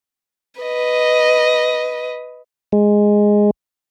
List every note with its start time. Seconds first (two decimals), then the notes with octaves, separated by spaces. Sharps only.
0.61 B4 D#5
2.72 G#3